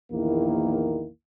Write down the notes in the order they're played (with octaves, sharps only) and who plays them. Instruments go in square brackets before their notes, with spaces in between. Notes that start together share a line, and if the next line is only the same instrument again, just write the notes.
[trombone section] A#1 E2 D#3 A#3 E4